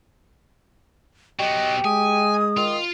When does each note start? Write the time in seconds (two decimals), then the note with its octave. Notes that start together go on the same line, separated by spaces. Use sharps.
1.39 F#3 B3 G4 D#5
1.85 G#3 G#5 D#6
2.57 D#3 F4